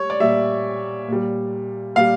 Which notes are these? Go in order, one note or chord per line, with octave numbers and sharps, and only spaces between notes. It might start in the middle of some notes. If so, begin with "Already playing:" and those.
Already playing: G3 C#5
D5
A#2 G3 E5
A#2 G3
A#2 G3 F5